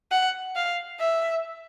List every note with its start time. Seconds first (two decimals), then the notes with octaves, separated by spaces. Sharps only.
0.11 F#5
0.56 F5
1.00 E5